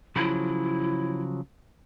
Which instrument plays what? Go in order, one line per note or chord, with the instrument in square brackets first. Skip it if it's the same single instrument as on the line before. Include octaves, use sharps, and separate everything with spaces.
[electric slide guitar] C#3 F3 F#3 [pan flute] E4